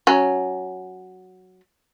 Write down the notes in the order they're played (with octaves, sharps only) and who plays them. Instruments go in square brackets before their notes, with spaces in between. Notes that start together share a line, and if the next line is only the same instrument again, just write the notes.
[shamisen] F#3 C#4